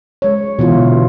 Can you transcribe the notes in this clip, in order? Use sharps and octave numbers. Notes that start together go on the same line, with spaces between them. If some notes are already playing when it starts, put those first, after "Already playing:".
G#3 C#5
B2 E3 E4 F4
D3